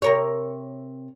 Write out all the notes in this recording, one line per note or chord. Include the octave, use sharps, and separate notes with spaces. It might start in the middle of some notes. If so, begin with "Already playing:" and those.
C3 A#4 C#5